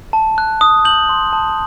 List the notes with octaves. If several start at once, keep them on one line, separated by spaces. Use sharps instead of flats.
A5
F#6
D#6
G6 F#7
C6
A5